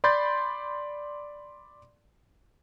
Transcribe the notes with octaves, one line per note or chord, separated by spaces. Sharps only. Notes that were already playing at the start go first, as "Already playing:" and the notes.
D5 B5 C6 G6 A6